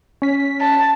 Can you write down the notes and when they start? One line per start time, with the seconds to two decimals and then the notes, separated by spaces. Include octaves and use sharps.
0.22 C#4 B6
0.61 A5